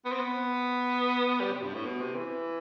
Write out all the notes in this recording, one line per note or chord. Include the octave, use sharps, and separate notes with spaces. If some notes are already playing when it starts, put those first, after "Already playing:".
B3
C4
B3
G3
C3
G2
A2
B2
C3
E3